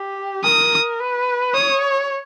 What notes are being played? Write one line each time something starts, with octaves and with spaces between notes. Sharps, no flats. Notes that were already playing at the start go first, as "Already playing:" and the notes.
Already playing: G4
A#4 D#6
B4
C#5 D#6